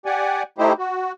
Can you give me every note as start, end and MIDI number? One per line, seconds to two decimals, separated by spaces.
0.06 0.43 67
0.06 0.43 74
0.06 0.43 78
0.06 0.43 80
0.58 0.73 57
0.58 0.73 63
0.58 0.73 64
0.58 0.73 67
0.58 0.73 72
0.78 1.12 66